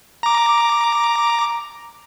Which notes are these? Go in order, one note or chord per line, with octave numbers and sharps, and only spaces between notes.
A#5 D6